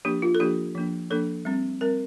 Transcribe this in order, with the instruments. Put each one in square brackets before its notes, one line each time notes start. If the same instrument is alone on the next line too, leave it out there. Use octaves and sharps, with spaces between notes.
[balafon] F3 A#3 D4 G4
F4
A4
F3 A#3 D4 G4
F3 A#3 D4
F3 A#3 D4 A4
G3 C4
G3 C4 A#4